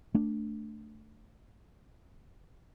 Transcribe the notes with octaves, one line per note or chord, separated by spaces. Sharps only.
A3 D4